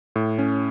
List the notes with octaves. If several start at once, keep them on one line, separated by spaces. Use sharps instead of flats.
A2
C#4